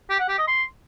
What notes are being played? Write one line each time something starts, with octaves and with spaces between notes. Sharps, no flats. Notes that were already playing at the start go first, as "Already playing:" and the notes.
G4
F#5
G4
D#5
C6